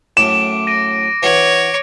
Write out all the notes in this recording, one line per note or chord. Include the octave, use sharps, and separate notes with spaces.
F#2 A2 D6 D7 E7
A#6 D7 D#7
E3 F#4 C#5